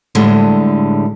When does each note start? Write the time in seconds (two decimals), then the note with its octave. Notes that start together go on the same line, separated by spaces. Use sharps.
0.15 A2 D3 G3 G#3